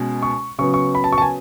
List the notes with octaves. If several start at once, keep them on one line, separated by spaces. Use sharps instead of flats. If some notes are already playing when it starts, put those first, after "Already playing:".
Already playing: B2 G#3 C#4
C#6
C#3 F#3 B3 C#6
C#6
B5
A5
C#6
A5
G#5